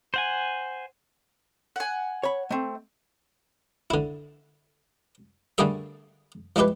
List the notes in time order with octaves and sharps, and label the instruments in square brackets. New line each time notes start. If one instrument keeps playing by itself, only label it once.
[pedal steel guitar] C5 F#5 G#5
[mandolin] F#5 G#5
[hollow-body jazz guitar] C#5 B5
A3 C4
[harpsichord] D3 E4
D3 G3 A3 A#3 G#4 E5
F3 G#3 E4 G4 B4